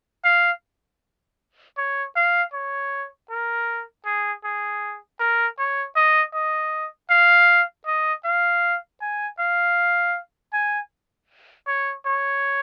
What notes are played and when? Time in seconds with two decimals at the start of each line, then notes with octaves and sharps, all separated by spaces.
0.24 F5
1.77 C#5
2.16 F5
2.53 C#5
3.30 A#4
4.06 G#4
4.44 G#4
5.20 A#4
5.59 C#5
5.96 D#5
6.34 D#5
7.10 F5
7.87 D#5
8.25 F5
9.01 G#5
9.39 F5
10.53 G#5
11.68 C#5
12.06 C#5